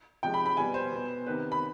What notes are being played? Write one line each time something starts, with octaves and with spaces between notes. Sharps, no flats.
C3 F3 G#3 G5
B5
B5
B2 G3 B3 G#5
C5
B2 B3
C3 D#3 B3 B4
B5